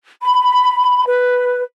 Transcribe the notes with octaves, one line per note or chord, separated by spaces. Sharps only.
B5
B4